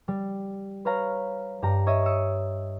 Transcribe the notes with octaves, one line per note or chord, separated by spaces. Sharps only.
G3
B4 C#5 F5 A#5
G2 G4 A#5
C#5 D#5 E5 D#6
D#6 E6 C#7